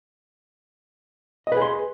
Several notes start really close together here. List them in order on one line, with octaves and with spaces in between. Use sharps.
D#5 B4 G#4 C6